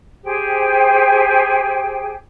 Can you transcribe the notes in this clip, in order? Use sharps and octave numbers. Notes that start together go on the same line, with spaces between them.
G4 G#4 C5 G5